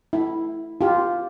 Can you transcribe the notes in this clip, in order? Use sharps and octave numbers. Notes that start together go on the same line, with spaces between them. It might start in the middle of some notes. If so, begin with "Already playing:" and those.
E4
F4 G4